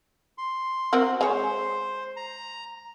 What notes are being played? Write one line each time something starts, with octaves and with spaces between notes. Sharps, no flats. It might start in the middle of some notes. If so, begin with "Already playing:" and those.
C6
C4 F#4 A#4
G#3 C5 C#5
A#5